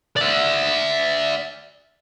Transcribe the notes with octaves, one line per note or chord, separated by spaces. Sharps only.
D5 E5